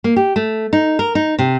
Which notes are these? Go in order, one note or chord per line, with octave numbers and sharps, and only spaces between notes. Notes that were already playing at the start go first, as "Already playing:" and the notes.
A#3
G4
A3
D#4
A#4
D#4
C3